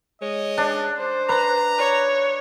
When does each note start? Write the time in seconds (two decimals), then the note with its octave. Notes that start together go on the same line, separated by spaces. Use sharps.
0.22 G#3 C#5 D#5
0.58 D4
0.98 C5
1.29 B4 A#5
1.78 C#5